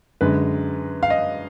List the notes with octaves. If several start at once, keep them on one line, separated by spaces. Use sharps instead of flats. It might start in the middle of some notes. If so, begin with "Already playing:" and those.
F#2 D3 G#3 B4
F5
D#5